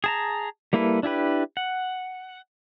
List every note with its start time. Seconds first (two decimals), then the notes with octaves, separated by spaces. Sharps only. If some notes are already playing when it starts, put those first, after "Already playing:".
0.04 G#4 A5 A#5
0.73 G3 A#3 E4 A4 B4
1.03 D4 E4 G4 B4
1.57 F#5